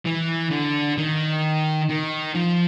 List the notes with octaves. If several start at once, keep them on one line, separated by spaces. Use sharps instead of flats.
E3
D3
D#3
D#3
F3